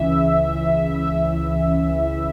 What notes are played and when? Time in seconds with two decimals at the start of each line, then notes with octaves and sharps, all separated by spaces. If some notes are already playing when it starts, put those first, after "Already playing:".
Already playing: C#2 C#3 E3 E5
0.96 E5